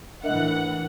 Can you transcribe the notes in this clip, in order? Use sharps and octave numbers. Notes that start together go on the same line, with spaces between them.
A2 E3 D4 A#4 D#5 E5 F#5